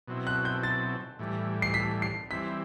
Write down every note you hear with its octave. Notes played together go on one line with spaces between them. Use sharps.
B2 F#3 C4 E4
F#6
G6
A6
A2 E3 G3
C7
B6
C7
E3 G3 C4 E4 B6